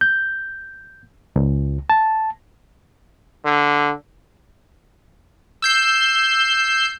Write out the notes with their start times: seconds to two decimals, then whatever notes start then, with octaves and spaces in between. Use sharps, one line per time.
0.01 G6
1.36 C#2
1.90 A5
3.45 D3
5.62 E6 G6 C7